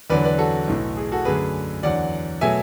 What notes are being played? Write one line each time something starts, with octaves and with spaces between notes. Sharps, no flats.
E2 D3 F#3 B4 D5
B4 D5
F#4 A4
B1 A2 E3
G#4
F#4 A4
F#2 D3 A3 D4 G#4 B4
E2 D3 F#3 D5 F#5
B2 F#3 A3 E5 G#5